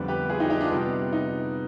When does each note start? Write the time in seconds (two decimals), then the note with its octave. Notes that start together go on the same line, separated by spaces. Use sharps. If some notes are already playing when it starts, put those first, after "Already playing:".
Already playing: F2 D3 G3 B3
0.08 G4 B4
0.29 F4 G#4
0.40 D#4 G4
0.50 D#4 G4
0.61 D4 F4
0.71 C3 G3 B3
1.13 D#4